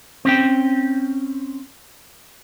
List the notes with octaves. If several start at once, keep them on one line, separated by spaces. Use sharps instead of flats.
C4 C#4 G5